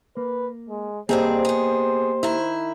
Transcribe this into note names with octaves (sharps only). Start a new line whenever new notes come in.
A#3 B4
G#3
G2 A#3 C4 G4 G#4 C5 D#5
B3 G#4
D#3 E4